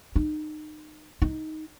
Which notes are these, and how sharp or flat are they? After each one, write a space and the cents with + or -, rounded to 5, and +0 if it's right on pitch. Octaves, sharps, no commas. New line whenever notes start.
D#4 -30
D#4 +10